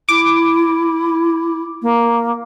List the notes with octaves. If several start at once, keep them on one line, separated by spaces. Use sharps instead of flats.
E4 D6
A#3